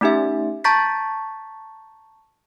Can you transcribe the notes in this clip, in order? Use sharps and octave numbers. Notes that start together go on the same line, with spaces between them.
A3 C#4 D#4 G4 E5
A5 A#5 C#6 G6 A6 B6